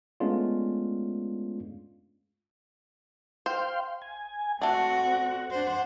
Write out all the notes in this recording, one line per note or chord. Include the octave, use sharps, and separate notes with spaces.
G#3 A3 B3 C#4 D4 F4
C5 F5 G5 C6
G#5
A3 C4 D4 F#4 F#5
D4 C5